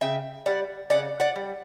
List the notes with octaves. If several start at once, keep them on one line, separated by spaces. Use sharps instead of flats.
C#3 E5 G5
G3 D5 F#5
C#3 D5 F#5
D5 F#5
G3